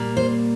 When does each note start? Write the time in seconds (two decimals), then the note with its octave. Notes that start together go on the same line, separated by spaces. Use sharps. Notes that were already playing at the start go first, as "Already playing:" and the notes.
Already playing: A#2 G3 A#3
0.17 C5